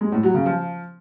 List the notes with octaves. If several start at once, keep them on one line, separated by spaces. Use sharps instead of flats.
G#3
A2
F#3
C#3
F3